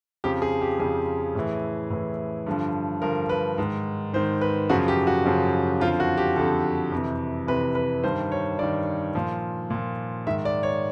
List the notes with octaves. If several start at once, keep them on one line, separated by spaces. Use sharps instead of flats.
F2 C#3 F3 G4
G#4
G4
F2 C#3 F3 G#4
A2 E3
A2 E3
G2 D3 F3
G2 D3 F3 A#4
B4
G#2 D#3
G#2 D#3 C5
B4
F#2 C#3 F3 F#4
G4
F#4
F#2 C#3 F3
F2 D3 F3 F4
F#4
G4
F2 D3 F3 A4
F2 C3 E3
F2 C3 E3 B4
B4
G2 D#3 C5
C#5
G2 D#3 D5
A#2 F3
A#2 F3
G#2 D#3 E5
D5
C#5